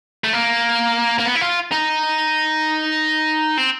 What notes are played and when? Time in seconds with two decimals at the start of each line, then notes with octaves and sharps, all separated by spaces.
0.24 A3
0.33 A#3
1.19 A#3
1.26 B3
1.35 E4
1.41 F4
1.72 D#4
3.58 C4